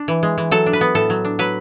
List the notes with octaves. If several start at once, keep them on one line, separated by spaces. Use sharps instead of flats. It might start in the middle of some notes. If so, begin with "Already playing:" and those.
Already playing: D4
E3
G#3
E3
F#3 A4
D4
B4
B3
A2 A4
F#3
D4
F#3 B4